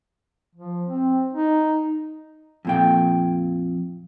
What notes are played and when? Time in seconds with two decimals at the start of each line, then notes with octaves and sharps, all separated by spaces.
0.55 F3
0.86 C4
1.33 D#4
2.65 F2 A#2 G5